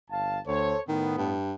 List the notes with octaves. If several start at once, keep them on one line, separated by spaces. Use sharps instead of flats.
G1 F5 A5
D2 A4 C5 C#5
A2 D#3 B3
G2